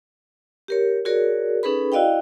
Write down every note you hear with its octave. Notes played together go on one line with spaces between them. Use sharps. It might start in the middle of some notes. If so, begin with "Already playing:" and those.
G4 A#4 C#5
F#4 G#4 A#4 C#5 D5
C#4 D#4 G#4 A4 B4 B5
E4 F#4 D5 D#5 F5 G5